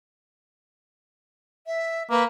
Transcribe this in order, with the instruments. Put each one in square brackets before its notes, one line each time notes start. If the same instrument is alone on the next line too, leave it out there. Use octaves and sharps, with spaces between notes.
[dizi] E5
[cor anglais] A#3 [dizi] B4